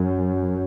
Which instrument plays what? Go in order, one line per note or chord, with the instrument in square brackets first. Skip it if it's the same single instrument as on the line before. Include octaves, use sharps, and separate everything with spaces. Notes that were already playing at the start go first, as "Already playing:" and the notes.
Already playing: [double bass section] F#2